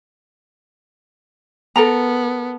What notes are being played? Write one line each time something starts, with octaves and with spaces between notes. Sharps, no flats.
B3 A4 A#4 A#5